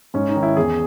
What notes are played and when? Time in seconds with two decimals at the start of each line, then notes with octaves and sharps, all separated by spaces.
0.14 G#2 C#4
0.29 D#4
0.36 D#3
0.43 E4
0.56 E2 G#4